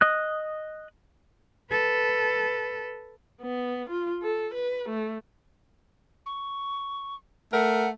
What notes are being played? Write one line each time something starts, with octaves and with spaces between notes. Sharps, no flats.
D#5 D#6 F#6
A4 B4
B3
F4
A4
B4
A3
C#6
A3 A#4 F#5